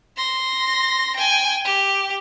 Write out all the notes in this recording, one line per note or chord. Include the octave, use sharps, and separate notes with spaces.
C6 A#6
G5 G#5
G4